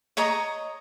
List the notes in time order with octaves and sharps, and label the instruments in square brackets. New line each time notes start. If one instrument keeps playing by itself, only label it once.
[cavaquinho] C#5 D#5 A#5 D#6